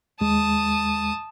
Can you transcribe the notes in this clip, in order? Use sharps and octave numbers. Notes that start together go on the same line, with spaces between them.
D#2 G#3 A5 D#6